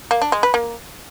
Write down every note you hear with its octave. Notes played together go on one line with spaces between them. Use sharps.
A#3
D4
G#3
B4
A#3